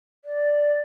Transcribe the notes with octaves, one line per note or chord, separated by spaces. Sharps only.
D5